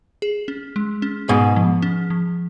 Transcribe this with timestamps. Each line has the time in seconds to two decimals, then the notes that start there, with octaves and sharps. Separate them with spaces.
0.22 G#4
0.48 C#4
0.76 G#3
1.02 C#4
1.29 G#2 B2 G#4
1.56 F3
1.82 C#4
2.10 F3